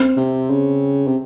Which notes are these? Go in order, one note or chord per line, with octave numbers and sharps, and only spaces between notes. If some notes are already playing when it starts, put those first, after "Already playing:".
Already playing: C4
C3
C#3
C3